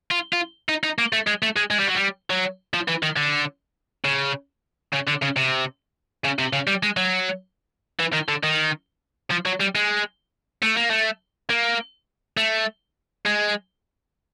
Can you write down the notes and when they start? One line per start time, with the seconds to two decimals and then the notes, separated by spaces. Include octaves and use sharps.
0.11 F4
0.33 F4
0.69 D#4
0.84 D#4
0.98 A#3
1.13 A3
1.27 G#3
1.43 A3
1.57 G#3
1.71 G#3
1.79 G3
1.88 F#3
1.95 G3
2.30 F#3
2.74 F3
2.88 E3
3.03 D#3
3.17 D3
4.05 C#3
4.93 C#3
5.07 D3
5.22 C#3
5.36 C3
6.24 C#3
6.39 C3
6.53 C#3
6.67 G3
6.83 G#3
6.97 F#3
8.00 E3
8.13 D#3
8.29 D3
8.43 D#3
9.31 F3
9.46 F#3
9.60 G3
9.75 G#3
10.63 A3
10.77 A#3
10.90 A3
11.50 A#3
12.37 A3
13.25 G#3